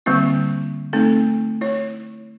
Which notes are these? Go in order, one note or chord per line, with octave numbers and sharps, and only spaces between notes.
D3 G3 A#3 C4 E4
A3 C4 D#4 A4
E4 C#5